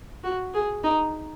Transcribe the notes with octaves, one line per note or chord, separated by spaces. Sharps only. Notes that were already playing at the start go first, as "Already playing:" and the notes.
F#4
G#4
D#4